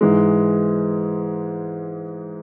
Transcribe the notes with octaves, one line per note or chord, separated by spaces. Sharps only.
G#2 E3 G#3